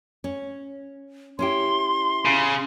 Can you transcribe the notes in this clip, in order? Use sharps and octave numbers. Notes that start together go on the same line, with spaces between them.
C#4
C#4 E4 G4 C6
C#3